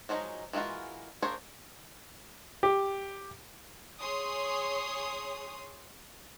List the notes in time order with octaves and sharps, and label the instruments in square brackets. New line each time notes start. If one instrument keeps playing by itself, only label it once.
[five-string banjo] F3 F#3 G#3 D#4
E3 G#3 A#3 F4 F#4
A#3 D4 G#4 C5 C#5
[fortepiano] G4
[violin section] G#4 C#5 C6 D#6